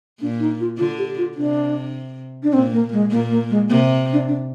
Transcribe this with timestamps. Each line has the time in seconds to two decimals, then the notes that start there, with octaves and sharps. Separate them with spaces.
0.21 A#2 D4
0.40 D#4
0.60 F4
0.78 D3 F4
0.98 G4
1.18 F4
1.37 C3 D4
2.43 D4
2.53 A#2 C4
2.72 A#3
2.92 G#3
3.11 A#2 A#3
3.31 A#3
3.50 G#3
3.69 C3 A#3
4.13 D4
4.28 D4